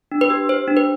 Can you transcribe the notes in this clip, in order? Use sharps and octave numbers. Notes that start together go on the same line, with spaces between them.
D4
B4
G4
G4 C5
D4
B4